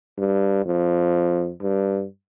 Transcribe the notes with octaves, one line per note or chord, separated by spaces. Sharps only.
G2
F2
G2